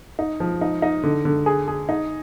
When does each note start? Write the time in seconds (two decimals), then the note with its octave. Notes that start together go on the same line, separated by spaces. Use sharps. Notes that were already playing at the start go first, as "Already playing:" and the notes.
0.19 D#4
0.40 F3
0.61 D#4
0.82 D#4
1.03 D3
1.25 D3
1.46 G#4
1.68 G#4
1.89 D#4